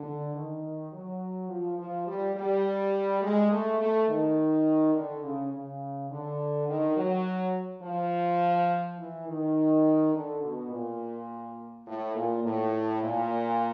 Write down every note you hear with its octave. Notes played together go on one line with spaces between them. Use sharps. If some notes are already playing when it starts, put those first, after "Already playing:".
Already playing: D3
D#3
F#3
F3
F3
G3
G3
G#3
A3
A3
D#3
D3
C#3
C#3
D3
D#3
F#3
F3
E3
D#3
D3
B2
A#2
A2
A#2
A2
A#2